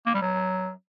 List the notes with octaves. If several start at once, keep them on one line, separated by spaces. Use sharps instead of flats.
A#3
G3
F#3